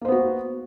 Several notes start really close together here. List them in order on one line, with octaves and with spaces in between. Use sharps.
A#3 C5 B3 F#4